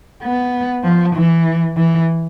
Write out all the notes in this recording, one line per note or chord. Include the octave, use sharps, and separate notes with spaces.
B3
F3
E3
E3